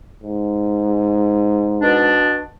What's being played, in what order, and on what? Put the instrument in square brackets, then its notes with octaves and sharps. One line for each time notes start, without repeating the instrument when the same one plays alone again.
[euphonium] G#2
[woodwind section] B2 D4